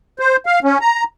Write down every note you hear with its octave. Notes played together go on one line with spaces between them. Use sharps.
C5
F5
C#4
A#5